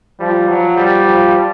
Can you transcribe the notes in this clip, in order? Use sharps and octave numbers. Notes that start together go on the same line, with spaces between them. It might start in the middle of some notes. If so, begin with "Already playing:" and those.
F3 G3
F3 F#3
G3
F3